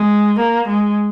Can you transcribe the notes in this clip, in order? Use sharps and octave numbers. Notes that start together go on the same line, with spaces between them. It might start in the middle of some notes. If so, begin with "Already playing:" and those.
Already playing: G#3
A#3
G#3